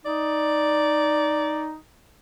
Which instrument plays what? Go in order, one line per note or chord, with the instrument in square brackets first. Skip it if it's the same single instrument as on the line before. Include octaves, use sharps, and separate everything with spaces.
[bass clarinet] D#4 [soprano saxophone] D5